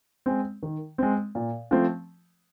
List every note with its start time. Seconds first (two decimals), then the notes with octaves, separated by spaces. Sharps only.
0.26 G#3 C4
0.63 D#3
0.98 G#3 C4
1.35 A#2
1.71 F3 A3 C4